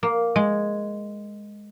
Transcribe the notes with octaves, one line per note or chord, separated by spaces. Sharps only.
A#3
G#3